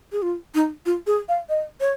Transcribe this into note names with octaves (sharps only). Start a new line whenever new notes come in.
G#4
F4
D#4
F4
G#4
F5
D#5
C#5